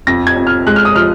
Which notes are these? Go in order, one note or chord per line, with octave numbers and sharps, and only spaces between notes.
F2 A#6
G#6
F2
F6
G#3 F#6
F6
D#6
F3 F6